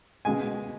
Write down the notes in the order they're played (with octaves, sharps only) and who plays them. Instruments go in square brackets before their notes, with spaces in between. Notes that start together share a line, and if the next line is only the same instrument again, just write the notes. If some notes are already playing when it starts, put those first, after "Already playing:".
[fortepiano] B2 G#3 G#5